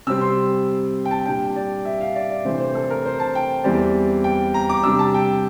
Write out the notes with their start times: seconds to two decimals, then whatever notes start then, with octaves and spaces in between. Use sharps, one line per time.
0.07 C3 G3 C4 E6
0.21 C6
1.05 G5
1.11 A5
1.26 A#2 G3 D4 G5
1.56 D5
1.85 E5
2.01 F5
2.16 D5
2.30 D5
2.45 C3 E3 A3 D4 C5
2.60 C5
2.75 A4
2.90 A#4
3.06 C5
3.20 A5
3.35 G5
3.64 E2 E3 G3 C4 D5
4.24 G5
4.54 A#5
4.70 D6
4.83 C3 G3 D4 E6
4.99 A5
5.14 G5